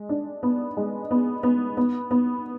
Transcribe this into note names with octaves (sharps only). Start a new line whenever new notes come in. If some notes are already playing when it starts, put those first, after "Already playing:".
Already playing: G#3
D4
B3
G#3
B3
B3
B3
B3